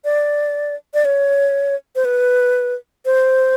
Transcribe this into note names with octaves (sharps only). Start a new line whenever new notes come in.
D5
D5
C#5
C5
B4
C5